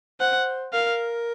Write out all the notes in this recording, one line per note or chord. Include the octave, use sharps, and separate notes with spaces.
C5 F#5
A#4 F5